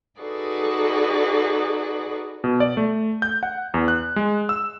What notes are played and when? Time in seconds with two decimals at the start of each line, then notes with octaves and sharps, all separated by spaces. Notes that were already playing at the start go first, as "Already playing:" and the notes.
0.20 D#4 F#4 G#4 A4 B4 D5
2.44 B2
2.60 D5
2.77 A3
3.22 G6
3.43 F#5
3.74 E2
3.88 F#6
4.16 G#3
4.49 E6